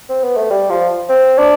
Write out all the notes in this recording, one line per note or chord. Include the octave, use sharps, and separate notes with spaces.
C4
B3
A3
G3
F3
C4
D4